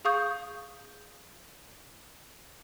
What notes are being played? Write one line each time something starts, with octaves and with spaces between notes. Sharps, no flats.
G#4 F5 C#6 D#6 G6